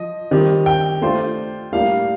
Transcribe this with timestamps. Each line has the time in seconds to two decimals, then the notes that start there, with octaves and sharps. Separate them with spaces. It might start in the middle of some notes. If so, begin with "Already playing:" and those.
Already playing: F3 D#5
0.31 D#3 G3 C4 G4
0.66 G5
1.02 A3 D4 F4 C5
1.72 A2 G3 A#3 D4 F5